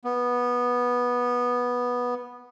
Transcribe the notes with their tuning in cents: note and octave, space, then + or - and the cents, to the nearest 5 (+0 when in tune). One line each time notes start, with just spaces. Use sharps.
B3 -10